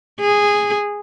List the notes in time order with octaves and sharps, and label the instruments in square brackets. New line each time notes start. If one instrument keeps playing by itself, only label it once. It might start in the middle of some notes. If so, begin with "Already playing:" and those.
[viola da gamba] G#4